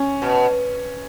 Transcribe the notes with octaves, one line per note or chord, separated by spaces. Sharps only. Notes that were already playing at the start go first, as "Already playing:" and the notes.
Already playing: C#4
B2